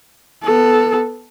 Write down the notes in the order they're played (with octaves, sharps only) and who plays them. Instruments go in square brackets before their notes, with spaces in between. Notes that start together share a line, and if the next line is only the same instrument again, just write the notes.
[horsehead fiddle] B3 A4